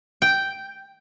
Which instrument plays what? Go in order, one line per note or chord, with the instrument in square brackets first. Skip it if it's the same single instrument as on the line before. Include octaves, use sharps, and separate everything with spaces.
[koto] G5